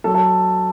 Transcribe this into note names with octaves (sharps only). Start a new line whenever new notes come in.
F#3 A4
A4